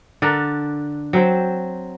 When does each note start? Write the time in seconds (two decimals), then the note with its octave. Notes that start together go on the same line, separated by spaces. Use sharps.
0.22 D3 D4 A4 A#4
1.13 F#3 C4 C5 G5